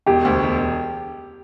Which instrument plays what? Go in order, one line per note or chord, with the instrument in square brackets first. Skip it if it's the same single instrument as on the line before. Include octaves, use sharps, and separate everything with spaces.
[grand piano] E1 [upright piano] G4
[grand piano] D2
E1